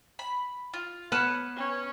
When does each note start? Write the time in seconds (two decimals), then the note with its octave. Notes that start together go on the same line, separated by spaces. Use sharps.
0.19 B5
0.73 F4
1.12 B3 B4 C#5 A5 F6
1.56 C#4